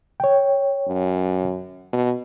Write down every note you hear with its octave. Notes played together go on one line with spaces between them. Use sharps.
C#5 G5
F#2
B2